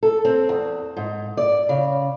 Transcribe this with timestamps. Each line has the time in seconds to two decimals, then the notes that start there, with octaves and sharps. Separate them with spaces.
0.03 A4
0.25 C4
0.49 E2
0.97 G#2
1.37 D5
1.69 C#3